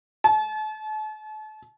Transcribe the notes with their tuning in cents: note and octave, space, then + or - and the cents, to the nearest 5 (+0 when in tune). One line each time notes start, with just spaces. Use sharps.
A5 -40